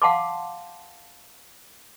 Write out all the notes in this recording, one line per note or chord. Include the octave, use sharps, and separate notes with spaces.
F5 F#5 A5 C6 D6